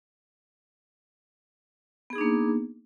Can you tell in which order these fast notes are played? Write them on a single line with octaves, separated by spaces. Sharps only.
B3 G#4 D#4 D4 A#3